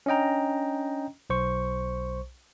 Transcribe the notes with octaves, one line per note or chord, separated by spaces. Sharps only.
C#4 D4 D#5 G5 A#5
B1 C5 C#6